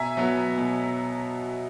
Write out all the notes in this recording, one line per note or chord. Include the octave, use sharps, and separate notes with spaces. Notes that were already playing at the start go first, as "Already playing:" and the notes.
Already playing: B2 E5 G#5 A#5
F#3 B3
B2